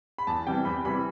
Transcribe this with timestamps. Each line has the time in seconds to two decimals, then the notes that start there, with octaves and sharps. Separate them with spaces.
0.18 B5
0.27 E2 A5
0.47 C3 E3 G3 G5
0.65 E2 B5
0.84 C3 E3 G3 B5